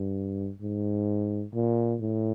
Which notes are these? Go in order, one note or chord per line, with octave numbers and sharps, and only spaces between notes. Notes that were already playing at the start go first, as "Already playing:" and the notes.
Already playing: G2
G#2
A#2
A2